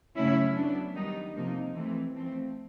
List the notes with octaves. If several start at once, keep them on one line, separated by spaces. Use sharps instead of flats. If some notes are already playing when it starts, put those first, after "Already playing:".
C#3 F#3 A3 C#4 E4
F#3 B3 D4
D#3 G3 B3 D#4
C3 F3 A#3 D#4
E3 A3 C4
F3 A3 C4